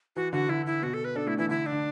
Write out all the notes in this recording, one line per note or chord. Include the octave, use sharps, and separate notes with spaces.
E3 F#4
D3 F#4
D3 E4
E4
B2 F#4
A4
B4
D4 A4
A3 E4
E3 E4
D3 E4
D4
D3